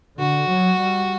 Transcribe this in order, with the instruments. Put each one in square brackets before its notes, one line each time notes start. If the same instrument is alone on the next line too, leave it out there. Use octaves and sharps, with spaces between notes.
[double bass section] D3 [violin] F#4
[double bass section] F#3
G3